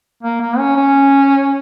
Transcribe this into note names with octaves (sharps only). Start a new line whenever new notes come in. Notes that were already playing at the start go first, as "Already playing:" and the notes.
A#3
A#3
C#4
C#4